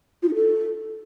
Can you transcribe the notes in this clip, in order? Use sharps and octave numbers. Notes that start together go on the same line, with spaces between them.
F4
D#4
A4